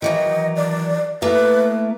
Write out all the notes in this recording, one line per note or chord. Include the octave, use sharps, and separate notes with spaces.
D#3 E3 F#3 D#5
D5
A3 A#3 E4 B4